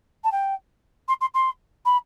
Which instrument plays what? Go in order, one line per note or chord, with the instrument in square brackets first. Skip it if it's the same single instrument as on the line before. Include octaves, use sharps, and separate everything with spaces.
[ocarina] A5
G5
C6
C6
C6
B5